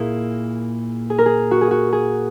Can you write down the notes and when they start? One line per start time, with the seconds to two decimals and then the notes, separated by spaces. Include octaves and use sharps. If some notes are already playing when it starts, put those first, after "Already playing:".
Already playing: A#2 A#3 E4 G#4 A#4
1.10 G#4
1.18 A#4
1.26 G#4
1.51 F#4
1.61 G#4
1.71 F#4
1.93 G#4